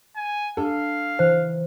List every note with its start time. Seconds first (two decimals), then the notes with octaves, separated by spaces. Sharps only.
0.16 G#5
0.57 D4 A4 F5
1.19 E3 C5